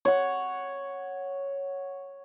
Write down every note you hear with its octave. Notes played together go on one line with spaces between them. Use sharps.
C#5 F#5